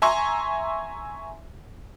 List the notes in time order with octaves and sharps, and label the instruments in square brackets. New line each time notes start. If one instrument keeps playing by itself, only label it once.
[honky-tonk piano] E5 G#5 A#5 C6 C#6